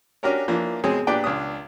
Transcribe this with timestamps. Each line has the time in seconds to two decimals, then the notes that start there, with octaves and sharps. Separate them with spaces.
0.23 C#4 D4 F#4 G4 A#4 C#5
0.48 E3 F3 A#3 D4
0.84 B2 G#3 C4 G#4 C#5
1.07 A#2 D4 G4 B4 D5 G5
1.24 C#2 D4 D#6